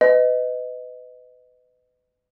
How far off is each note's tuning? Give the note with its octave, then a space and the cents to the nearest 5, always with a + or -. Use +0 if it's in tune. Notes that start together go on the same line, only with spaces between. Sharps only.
B4 +25 D#5 +0